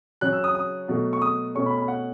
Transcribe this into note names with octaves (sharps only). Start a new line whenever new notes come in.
C#3 F#3 C#4 F#6
E6
D#6
D#6
B2 F#3 A3
C#6
D#6
B2 A3 C#4 C#6
B5
B5
F#5